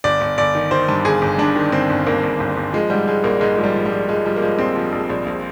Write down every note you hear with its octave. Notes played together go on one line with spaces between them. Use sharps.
G1 D5
G1
G1 D5
D#3
D#3 C5
G2
G1 G#4
G1
G2 D4
D#3
G1 C4
G1
G1 A#3
G1
G1
G1
F3 G#3
G#2 G3
G#2 G#3
A#1 A#3
G#2 G#3
F3 G#3
G3
F3
G3
F3
F3 G#3
F3 G3
A#3
F3 G#3
A#1 C4
F3
A#1
A#1
A#1